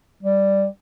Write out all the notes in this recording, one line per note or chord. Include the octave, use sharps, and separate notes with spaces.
G3